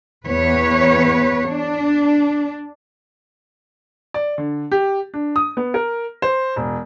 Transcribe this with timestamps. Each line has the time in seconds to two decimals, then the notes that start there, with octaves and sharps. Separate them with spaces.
0.25 E2 B4 C#5
1.48 D4
4.14 D5
4.38 D3
4.72 G4
5.14 D4
5.36 D#6
5.57 B3
5.74 A#4
6.22 C5
6.56 E1